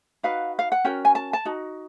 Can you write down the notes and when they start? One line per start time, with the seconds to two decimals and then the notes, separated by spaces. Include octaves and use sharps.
0.23 D#4 F#4 B4 F5
0.59 F5
0.72 F#5
0.84 C#4 F#4 A#4 G5
1.05 G#5
1.15 A5
1.33 A5
1.45 D#4 F#4